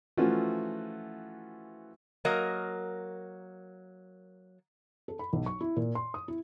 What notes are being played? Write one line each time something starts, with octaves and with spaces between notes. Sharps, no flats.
E3 F3 A3 C#4 F4 F#4
F#3 A#3 A#4 D#5
A4
B5
B1
C#6
E4
A#2
C6
D#6
E4